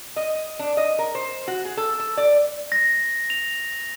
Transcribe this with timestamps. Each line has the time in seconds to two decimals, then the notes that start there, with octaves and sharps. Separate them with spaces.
0.16 D#5
0.59 D4
0.77 D#5
0.99 A#4
1.15 C5
1.48 F#4
1.65 G#4
1.77 A4
2.00 A4
2.17 D5
2.72 A#6
3.30 F7